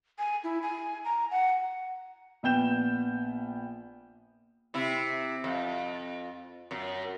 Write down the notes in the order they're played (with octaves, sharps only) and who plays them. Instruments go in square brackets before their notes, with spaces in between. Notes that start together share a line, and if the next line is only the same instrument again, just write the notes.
[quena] G#5
E4
G#5
A#5
F#5
[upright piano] A#1 B3 G5 G6 E7
[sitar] C3 E4
F2
F#2